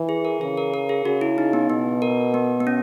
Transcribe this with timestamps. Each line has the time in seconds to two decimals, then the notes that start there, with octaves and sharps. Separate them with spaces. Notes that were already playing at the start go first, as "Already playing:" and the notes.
Already playing: E3
0.09 G#4
0.25 A#4
0.41 C#3 G#4
0.57 A#4
0.74 A#4
0.89 G#4
1.05 C#3 F#4
1.21 E4
1.38 D#4
1.53 B3
1.70 B2 B3
2.02 A#4
2.34 B3
2.60 B3
2.67 C#4